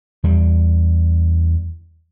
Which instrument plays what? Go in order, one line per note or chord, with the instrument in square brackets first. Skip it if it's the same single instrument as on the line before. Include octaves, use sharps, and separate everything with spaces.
[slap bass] E2 G3